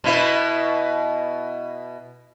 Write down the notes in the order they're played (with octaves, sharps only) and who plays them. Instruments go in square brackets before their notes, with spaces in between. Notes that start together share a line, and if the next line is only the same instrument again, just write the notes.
[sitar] B2 E4 B4